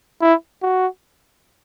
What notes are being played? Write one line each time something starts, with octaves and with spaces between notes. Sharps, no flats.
E4
F#4